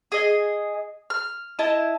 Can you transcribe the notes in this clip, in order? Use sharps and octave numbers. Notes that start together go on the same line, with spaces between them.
G#4 D#5
F6
E4 D#5 A5